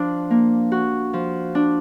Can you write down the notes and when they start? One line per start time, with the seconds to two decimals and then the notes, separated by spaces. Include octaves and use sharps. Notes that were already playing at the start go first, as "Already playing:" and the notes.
Already playing: F3 D4
0.30 A#3
0.72 F#4
1.13 F3
1.55 D4